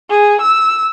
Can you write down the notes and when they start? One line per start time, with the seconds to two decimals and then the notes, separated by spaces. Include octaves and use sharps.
0.10 G#4
0.42 E6